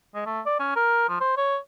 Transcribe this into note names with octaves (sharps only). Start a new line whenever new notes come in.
G#3
A3
D5
C#4
A#4
F3
C5
C#5